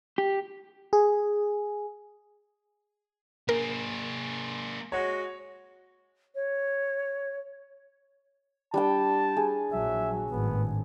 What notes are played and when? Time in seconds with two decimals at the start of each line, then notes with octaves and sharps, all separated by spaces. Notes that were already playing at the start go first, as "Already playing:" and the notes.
0.18 G4
0.93 G#4
3.49 A#3 G#4 A#4
4.92 G#3 F#4 C#5
6.35 C#5
8.74 G3 D4 G5 A5
9.37 G#4
9.72 A#1 F#3 E5
10.31 G#1 A2 B3